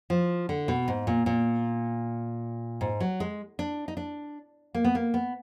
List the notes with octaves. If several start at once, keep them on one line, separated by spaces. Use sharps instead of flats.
F3
D3
B2
G#2
A#2
A#2
G#2
F#3
G#3
D4
D#4
D4
A#3
B3
A#3
B3